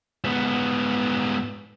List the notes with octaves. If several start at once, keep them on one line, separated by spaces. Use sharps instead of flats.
G#2 B3